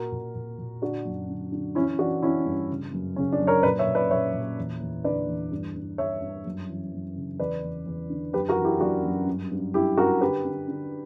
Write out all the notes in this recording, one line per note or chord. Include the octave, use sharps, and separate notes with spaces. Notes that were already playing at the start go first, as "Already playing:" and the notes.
Already playing: A#2 F#4 A#4
A#2
A#2
A#2
D3 D4 F#4
F#2
D3
D3
E3 C#4 E4
E3 D4 F#4
E3 C#4 E4
G2
C#3
F#2
C#3 C#4
D4
F#2
A#4 C#5
A#2 B4 D5
C#5 E5
A#2
B4 D5
A#2 C#5 E5
A#2
E2
E2
D3 B4 D5
E2
G2
G2
G2 C#5 E5
G2
F#2
E3
F#2
C#3
E2 B4 D5
E2
E2
D3
F#2 G4 B4
F#4 A#4
E3
E4 G4
F#2 D4 F#4
F#2
G2
G2
G2 E4 G4
G2 F#4 A#4
D3 G4 B4
D3
D3